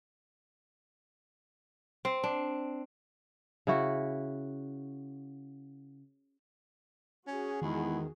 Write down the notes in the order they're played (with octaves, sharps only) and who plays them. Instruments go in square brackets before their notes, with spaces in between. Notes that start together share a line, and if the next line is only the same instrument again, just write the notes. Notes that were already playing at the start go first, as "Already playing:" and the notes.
[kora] C4
D4
C#3 E4 F#4
[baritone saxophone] C#4 [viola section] F#4 G#4
[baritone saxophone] E2 [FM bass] D#3 [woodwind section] G#3 B3 E4